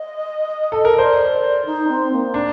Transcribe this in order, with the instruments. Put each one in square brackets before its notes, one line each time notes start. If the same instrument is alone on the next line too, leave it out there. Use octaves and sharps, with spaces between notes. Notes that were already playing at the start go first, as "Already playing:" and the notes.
Already playing: [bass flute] D#5
[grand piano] A4
A#4
[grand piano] C5 [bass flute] D5
[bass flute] D#4
C4
A#3
[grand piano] D4